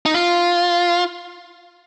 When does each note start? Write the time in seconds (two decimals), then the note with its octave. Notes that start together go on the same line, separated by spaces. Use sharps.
0.06 D#4
0.14 F4